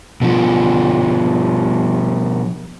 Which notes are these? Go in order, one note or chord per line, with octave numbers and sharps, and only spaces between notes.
B2 F3